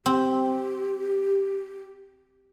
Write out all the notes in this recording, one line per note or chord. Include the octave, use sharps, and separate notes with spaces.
C4 G4